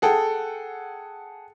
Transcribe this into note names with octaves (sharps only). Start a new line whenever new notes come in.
G#4 A4 F#5 G5